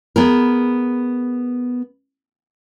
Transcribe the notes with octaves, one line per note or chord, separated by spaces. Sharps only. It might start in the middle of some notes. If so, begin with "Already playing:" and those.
B3 G#4 A#4